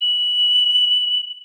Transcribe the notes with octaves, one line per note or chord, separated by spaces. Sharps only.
F#7